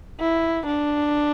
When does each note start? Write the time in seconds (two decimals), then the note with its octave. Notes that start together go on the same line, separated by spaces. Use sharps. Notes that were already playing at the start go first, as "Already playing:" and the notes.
0.20 E4
0.66 D4